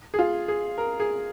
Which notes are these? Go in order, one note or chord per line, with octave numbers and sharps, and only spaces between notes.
G#4
F4
G#4
A#4
G#4